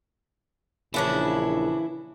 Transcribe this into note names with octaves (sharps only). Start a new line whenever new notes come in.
A#1 C#3 E3 C#4 D4 E4